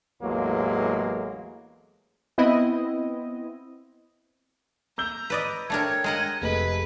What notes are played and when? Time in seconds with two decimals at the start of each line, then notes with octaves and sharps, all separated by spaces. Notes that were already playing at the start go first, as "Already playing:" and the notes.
0.22 A1 E2 A2 F#3 G#3 A#3
2.38 B3 C4 E4 D#5
4.98 A#5 E6 G6 G7
5.30 B4 D5 D#5
5.70 A3 D4 A#4 C#5 G5 G#5 G#6
6.04 G#3 A#4 D#5 F#5
6.42 F1 G#4 A4 B4 D#5 F#7